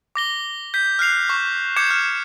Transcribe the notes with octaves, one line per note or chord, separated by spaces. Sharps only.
D6 A#6 G7
G6 B6
F6 F#6 C7 F7
C#6
D6 G6 G#6 C#7 E7
F6